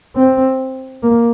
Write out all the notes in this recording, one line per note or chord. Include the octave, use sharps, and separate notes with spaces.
C4
A#3